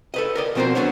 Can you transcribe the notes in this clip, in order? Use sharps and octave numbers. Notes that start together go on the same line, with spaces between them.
A4 B4 D#5
A#4 D5 D#5
B2 F3 C4 F#4 A#4 C5
D3 F#3 B3 D4 F#4 C#5